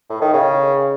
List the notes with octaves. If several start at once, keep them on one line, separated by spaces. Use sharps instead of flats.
A2
D#3
C#3